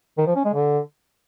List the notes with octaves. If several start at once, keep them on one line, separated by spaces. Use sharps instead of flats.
D#3
F3
C#4
G#3
D3